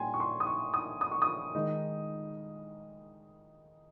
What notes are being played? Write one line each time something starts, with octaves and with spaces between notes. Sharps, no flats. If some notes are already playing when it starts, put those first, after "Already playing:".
Already playing: A#2 G3 G5 G#5 C6
C#6
C6
D#6
C#6
D#6
D#6
C#6
D#6
D#3 G#3 D#4